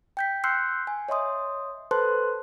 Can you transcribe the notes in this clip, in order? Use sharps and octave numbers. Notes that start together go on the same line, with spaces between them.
G5 G6 B6
C6 E6 F#6 G6 C7 C#7
G#5
C#5 D#5 E5 C6 D#6
A4 B4 C5 A5 C6 F#6